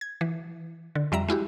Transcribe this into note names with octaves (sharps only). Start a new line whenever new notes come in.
G#6
E3
D3
F2 G3 E5 A#5
G#3 E4 F#4 G4